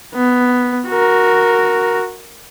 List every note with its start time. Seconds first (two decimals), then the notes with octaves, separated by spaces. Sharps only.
0.14 B3
0.87 F#4 A#4